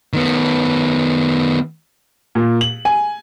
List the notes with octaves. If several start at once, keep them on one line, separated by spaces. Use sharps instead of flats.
D#3 B3
A#2
F#7
G#5